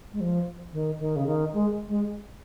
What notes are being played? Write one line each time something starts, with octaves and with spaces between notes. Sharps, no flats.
G#3
F3
D#3
D#3
C#3
D#3
G#3
G#3